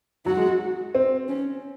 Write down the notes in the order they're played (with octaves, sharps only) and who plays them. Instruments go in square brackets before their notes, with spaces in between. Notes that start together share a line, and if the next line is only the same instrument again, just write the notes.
[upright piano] F#3 [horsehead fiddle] F#4
[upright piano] G#3
C4
[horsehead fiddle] C#4